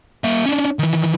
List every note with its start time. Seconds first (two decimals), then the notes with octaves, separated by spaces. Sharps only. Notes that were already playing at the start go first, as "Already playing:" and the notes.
0.24 A#3 E5
0.46 C#4 D4
0.79 D#3 E3